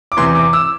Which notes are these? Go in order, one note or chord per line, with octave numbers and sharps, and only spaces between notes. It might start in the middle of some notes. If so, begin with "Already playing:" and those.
D6
E2 C3 E3 C6
D6
E6